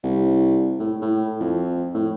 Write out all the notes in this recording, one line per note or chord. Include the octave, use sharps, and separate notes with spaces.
C2
A2
A2
F2
A2